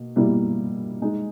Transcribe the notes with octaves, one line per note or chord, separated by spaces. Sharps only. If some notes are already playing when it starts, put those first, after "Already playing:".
Already playing: B2 A#3
B2 G3 A#3 E4
G#3 D#4 G#4